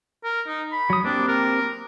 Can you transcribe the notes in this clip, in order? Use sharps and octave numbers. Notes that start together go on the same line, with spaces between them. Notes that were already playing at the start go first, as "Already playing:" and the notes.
A#4
D#4
B5
F#3 D#6
A#3 C4 D4 G4
A#4